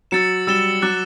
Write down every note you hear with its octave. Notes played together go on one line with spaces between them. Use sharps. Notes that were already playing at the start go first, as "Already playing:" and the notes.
F#3 E6 A6 C#7 E7
G3 E6 A6 E7 G7
F#3 D6 F#6 A6